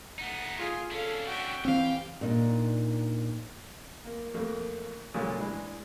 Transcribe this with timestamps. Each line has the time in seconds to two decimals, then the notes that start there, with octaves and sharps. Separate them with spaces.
0.19 A3 D#4 F#5
0.57 F4 G#4
0.91 C#4 D4 A4 F5
1.27 F#4 E5 G5
1.65 E3 C4 G4 F5 G5
2.21 A#2 D4 D#4
4.05 A#3
4.34 F2 A3 A#3
5.14 A#2 C#3 F3 F#3 G#3 A3
5.38 E3 G#3 D4 E4